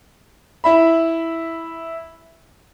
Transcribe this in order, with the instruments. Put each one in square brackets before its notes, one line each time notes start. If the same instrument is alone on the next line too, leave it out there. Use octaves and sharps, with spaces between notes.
[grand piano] E4 E5 B5